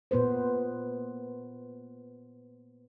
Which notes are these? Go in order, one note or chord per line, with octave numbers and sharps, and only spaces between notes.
A#2 B3 B4 C5